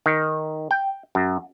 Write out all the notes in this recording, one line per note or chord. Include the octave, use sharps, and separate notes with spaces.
D#3
G5
F#2